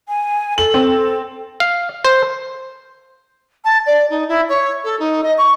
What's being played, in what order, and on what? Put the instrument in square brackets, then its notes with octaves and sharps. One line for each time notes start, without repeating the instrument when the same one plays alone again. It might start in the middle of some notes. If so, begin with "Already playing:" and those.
[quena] G#5
[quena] A4 [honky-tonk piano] F#7
[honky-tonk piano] C4
[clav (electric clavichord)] F5
C5
[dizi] A5
D5
D#4
E4
C#5
A4
D#4
D#5
C#6